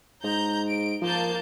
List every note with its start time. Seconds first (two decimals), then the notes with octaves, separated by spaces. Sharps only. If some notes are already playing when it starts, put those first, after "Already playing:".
0.24 G#2 A#5 G6
0.68 D7
1.02 F3 A#3 A5 G6